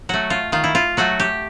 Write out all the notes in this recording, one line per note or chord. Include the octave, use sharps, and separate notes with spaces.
F#3 A3 F#4
F4
D#3 F4
E4
F4
F#3 A3 F#4
G4